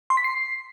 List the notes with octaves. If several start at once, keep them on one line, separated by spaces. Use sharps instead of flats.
C6
B6
C7